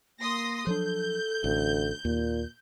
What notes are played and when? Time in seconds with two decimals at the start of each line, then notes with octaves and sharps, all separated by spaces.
0.19 A#3 C6 D#6 A#6
0.67 F3 F#3 D4 A4 G6
1.44 A1 D2
2.05 D#2 A#2